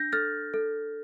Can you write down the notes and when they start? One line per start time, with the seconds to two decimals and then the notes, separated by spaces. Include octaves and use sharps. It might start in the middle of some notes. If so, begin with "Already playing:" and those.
Already playing: D4 G6 A#6
0.12 A4 F6 A6
0.54 A4